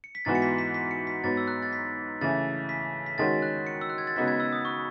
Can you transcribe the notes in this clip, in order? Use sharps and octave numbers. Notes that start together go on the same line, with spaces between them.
C#7
B6
G#2 E3 B3 F#4 A6
C#7
B6
B6
B6
C#7
B6
G#2 F#3 B3 A6
E6
F#6
A6
B6
C#3 E3 A3 A6
B6
B6
D#3 G#3 C#4 F#4 A6
F#6
C#7
E6
F#6
G#6
A6
C#3 G#3 B3 D#4 F#4 B6
G#6
E6
D#6
C#6